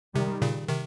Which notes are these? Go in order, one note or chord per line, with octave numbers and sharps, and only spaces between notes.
C3 D#3 G3
A#2 C#3
C3 D#3